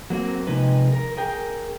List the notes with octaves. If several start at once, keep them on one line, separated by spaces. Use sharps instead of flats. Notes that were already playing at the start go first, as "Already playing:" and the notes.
F#3 A#3 C4
C3 F3 G#3 D#4 B4
A#4
G#4 A#4 G5